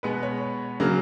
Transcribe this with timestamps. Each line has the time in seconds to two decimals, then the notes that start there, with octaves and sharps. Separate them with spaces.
0.03 B2 G#3 B3 B4
0.23 C#5
0.80 C#3 F#3 A#3